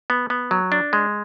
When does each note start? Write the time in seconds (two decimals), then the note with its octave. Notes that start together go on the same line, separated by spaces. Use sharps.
0.10 B3
0.30 B3
0.51 F#3
0.72 D4
0.93 G#3